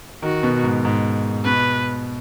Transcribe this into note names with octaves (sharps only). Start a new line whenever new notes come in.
D#3 F#4
B2
G#2
G#2
B2 B4